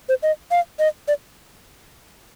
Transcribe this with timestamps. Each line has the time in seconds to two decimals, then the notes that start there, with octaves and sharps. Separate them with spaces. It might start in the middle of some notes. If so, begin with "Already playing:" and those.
0.09 C5
0.23 D#5
0.51 F5
0.79 D#5
1.08 D5